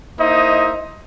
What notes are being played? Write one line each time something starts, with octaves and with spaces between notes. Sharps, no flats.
A#3 D#4 E4 C5 D#5 E5